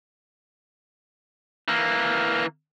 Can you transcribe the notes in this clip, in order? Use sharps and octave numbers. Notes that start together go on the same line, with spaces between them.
E3 A#3